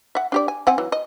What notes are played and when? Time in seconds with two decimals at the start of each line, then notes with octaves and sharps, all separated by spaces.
0.15 E5 F#5
0.32 D4 G4 D5
0.48 G#5
0.67 C4 F#5 G#5
0.78 E3 F#3
0.92 D#5